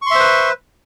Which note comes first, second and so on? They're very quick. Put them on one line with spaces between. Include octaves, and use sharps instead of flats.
C#6 C6 E5 C5 B4